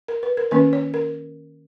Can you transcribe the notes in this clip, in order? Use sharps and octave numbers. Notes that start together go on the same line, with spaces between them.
A#4
B4
A#4
D#3 A#3 C#4 B4
C#5
A#4